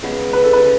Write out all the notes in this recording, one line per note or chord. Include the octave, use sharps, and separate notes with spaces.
C#3 G#3 B3
B4
A4
B4
C#3